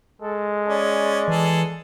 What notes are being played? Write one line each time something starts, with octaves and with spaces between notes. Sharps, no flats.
G#3 A4
C#4 D5
E3 G#4 A4